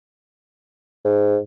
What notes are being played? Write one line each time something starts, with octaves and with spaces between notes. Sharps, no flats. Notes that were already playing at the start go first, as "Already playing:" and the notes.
G#2